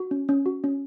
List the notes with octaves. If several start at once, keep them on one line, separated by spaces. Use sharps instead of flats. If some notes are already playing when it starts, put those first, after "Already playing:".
Already playing: F#4
C#4
C#4
F#4
C#4